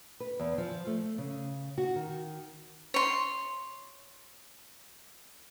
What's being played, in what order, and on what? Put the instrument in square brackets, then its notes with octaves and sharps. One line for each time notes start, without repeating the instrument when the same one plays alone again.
[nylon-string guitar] B4
E2
F3
A3
C#3
F#4
D#3
[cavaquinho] C#5 C6